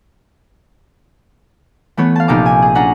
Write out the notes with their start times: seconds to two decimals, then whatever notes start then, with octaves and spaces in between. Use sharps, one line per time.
1.97 E3 A3 B3 C#5
2.16 F5 A5
2.28 A#1 C3 D#4 A5 D6
2.46 G#5
2.62 G#4
2.75 C#4 D4 F#5 A#5